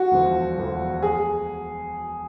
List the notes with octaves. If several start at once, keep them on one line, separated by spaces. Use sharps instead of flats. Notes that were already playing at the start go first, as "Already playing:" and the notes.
Already playing: F#4
E1 D2 D3 F3
E1 D2 D3 F3
G#4